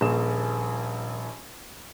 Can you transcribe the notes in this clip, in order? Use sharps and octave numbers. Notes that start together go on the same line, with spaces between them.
D#1 A#1 G#4 E7